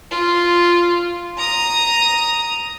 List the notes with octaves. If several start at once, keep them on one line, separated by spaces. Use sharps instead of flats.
F4
A#5 D#6